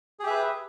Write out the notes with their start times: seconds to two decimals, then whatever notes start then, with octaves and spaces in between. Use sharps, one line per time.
0.20 G#4
0.23 G4
0.27 E5
0.30 B4